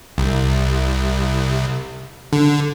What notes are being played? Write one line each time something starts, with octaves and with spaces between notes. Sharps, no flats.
C2
D3